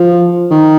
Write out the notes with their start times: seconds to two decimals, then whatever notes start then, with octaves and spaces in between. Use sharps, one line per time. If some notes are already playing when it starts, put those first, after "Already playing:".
Already playing: F3
0.51 D#3